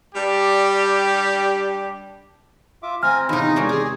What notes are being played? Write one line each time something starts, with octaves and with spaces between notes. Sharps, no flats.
G3 D4 G4
F4 E5 D6
C4 G#5 A#5 F6
E2 C3 C#4 D#4 F4 D#5 B5
G#3 C4 A#4 C#5 D5 G#5
D#4 G#4